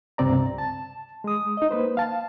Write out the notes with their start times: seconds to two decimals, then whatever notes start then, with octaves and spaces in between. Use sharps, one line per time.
0.18 C#2 G2 C3 C4 D5 A#5
0.58 A5
1.24 G#3 D#6
1.57 D#4 D#5
1.71 A#3 B4 C5
1.97 F5 A5